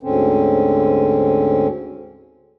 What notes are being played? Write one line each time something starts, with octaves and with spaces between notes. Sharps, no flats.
D2 G#2 D3 C4 C#4